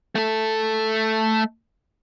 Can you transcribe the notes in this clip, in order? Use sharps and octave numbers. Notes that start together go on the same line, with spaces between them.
A3 A4